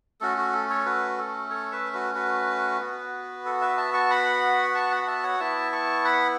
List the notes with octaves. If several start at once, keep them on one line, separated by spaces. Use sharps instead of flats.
A3 C#4 F#4 A4
F#4
A4
A4 C#5
F#4 B4
A4
A4 C#5
B4 E5
F#4 B4
F#4 B4
B3 F#4
A4
B4 E5
E5 A5
A5 C#6
F#5 B5
A5 C#6
F#5 B5
F#5
E5 A5
C#5 F#5
B3 E4 E5 A5
A5 C#6
F#5 B5